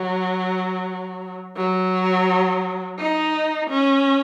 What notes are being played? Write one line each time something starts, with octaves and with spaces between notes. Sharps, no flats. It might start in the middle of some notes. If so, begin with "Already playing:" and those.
Already playing: F#3
F#3
D#4
C#4